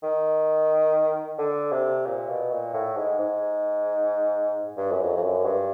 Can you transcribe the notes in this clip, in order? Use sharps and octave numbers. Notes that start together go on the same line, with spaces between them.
D#3
D3
C3
A#2
B2
A#2
A2
G#2
G#2
G2
F#2
F2
F2
F#2
G2